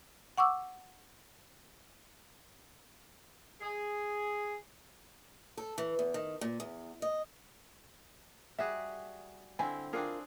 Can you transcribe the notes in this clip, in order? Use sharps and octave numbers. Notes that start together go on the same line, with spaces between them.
F#5 C#6 D6 E6
G#4
A4
E3
E2
D#3
A#2
E2
D#5
G3 F#4 G#4 E5
D3 C4 E4 G#5
C4 D4 F4 G#4 A#4